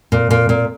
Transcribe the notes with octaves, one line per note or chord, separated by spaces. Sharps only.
A#2
A#2
A#2